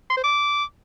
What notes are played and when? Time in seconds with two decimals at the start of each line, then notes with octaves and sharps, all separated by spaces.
0.10 C6
0.17 C5
0.24 D6